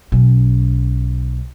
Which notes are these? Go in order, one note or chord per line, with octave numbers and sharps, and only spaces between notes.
B1 C#4